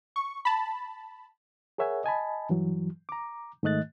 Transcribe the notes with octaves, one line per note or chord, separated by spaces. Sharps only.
C#6
A5 B5
G#4 A#4 C#5 E5 F#5 G#5
D#5 G#5 A5 B5
G2 E3 F#3
A#5 D6
G#2 D#3 A3 D#5 F#6 A6